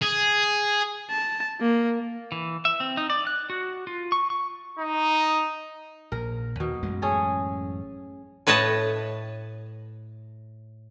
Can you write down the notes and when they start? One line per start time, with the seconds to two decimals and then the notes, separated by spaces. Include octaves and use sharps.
0.02 G#4
1.10 A5
1.60 A#3
2.32 E3
2.65 E5
2.80 C4
2.97 D#4
3.10 D5
3.27 F#6
3.50 F#4
3.87 F4
4.12 C#6
4.30 C#6
4.79 D#4
6.12 A#1 A#4
6.60 D#2 B2 D#3
6.82 A1 F#2 G#3
7.02 C#4 G#4 A4
8.47 A2 B4 C#5 D#5 A5